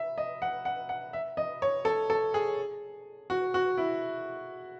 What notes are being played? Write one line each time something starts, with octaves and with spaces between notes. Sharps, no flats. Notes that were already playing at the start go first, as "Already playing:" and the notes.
Already playing: E5
D#5
F#5
F#5
F#5
E5
D#5
C#5
A4
A4
G#4
F#4
F#4
E4